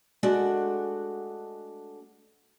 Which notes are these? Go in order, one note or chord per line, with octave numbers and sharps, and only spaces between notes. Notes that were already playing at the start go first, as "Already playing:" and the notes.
G#3 A3 D4 F#4 F#5